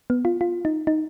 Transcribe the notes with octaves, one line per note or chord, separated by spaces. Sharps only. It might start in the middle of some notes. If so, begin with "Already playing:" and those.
B3
F4
F4
D#4
D#4